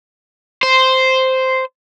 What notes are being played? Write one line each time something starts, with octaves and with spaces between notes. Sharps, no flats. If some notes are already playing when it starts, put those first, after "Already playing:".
C5